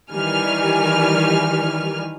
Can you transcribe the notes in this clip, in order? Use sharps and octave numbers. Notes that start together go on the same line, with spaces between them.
D#3 E3 G3 G#5 F6